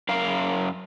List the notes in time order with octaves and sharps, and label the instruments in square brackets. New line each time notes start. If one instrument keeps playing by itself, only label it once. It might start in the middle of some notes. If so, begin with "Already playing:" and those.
[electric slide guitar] F#2 A#4 F5